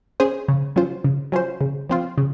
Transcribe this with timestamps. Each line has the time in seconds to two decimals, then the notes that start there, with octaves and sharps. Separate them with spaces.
0.20 C#4 G#4 C5
0.48 C#3
0.76 F#3 C#4 F4 C5
1.04 C#3
1.32 F#3 C#4 F4 C5
1.61 C#3
1.89 F3 C4 F4
2.18 C#3